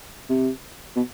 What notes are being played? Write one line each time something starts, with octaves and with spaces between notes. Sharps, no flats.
C3
B2